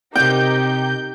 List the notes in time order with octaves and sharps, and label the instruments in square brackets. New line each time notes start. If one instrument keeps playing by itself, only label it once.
[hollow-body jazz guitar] C3 C4 [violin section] D#4 G4 A#4 [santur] G5 [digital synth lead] G6